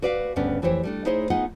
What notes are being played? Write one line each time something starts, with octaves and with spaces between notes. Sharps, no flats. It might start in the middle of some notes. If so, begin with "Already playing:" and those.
F#4 B4 D5 E5 F5
D2 G2 C#3 B3 C#4 D4
F2 E3 E4 G4 C5 C#5
G3 A3 D4
D#4 E4 G#4 C5 C#5 D#5
B3 D#4 F4 G#4 D#5 F#5